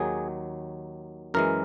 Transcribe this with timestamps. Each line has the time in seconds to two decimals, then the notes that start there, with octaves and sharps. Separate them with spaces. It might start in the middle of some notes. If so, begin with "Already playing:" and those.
Already playing: D#2 D#3 F#3 G#4
1.34 F#2 E3 G#3 A#4